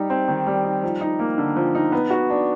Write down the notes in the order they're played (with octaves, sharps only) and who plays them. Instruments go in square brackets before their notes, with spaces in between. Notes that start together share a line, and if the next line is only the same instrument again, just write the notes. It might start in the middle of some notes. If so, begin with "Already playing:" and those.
Already playing: [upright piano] G3 D#4
C4
D#3
G3
D#4
F3
D#4
A#3
D3
F3
D#4
B3
F#4
D4